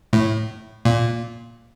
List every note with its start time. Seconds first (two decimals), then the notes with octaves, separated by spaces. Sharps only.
0.13 A2
0.85 A#2